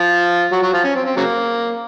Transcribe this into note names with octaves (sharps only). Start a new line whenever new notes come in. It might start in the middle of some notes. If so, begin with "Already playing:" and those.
Already playing: F3 F4
F#3 F#4
F#3 F#4
F3 F4
C#4
C4
C4
C#3 F#3 A#3